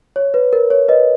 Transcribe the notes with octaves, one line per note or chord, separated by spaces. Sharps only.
C#5
B4
A#4
C#5
B4 D#5